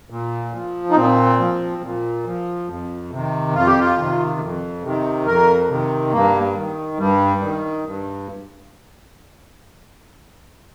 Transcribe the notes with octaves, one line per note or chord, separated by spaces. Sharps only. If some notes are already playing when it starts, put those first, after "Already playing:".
A#2
F3
D#4
A#2 C4
F3
A#2
F3
F2
C3 D#3
F2 F4
G4
F4
C3 D#3
F2
C3 D#3
F2 A#4
C3 D#3
G2 A#3
D#3
G2 G3
D#3
G2